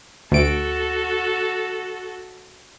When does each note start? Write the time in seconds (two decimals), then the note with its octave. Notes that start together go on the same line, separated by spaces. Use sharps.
0.32 D2 F#4 A4 D7